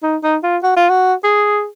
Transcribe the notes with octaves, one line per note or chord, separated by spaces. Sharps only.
D#4
D#4
F4
F#4
F4
F#4
G#4